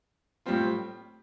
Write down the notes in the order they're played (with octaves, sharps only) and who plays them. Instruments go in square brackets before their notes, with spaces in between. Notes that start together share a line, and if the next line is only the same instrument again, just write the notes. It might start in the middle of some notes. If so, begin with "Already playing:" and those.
[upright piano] A2 G3 C4 F4